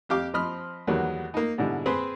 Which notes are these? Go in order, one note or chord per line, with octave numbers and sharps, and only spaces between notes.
F2 G4 F5 D6
F3 C4 D#5 B5 F6
E2 D#3 F#3 G3 A#3 B3
A#3 D#4
G#2 B2 D3 G3 E4
C4 G#4 B4 C5 B5